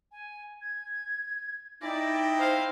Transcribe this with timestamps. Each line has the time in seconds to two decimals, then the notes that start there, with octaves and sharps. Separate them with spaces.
0.12 G#5
0.61 G#6
1.81 D#4 E4 D5 G5 A#6
2.38 C5 F5